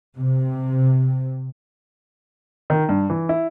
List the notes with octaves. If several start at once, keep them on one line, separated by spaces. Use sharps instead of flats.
C3
D#3
G2
E3
E4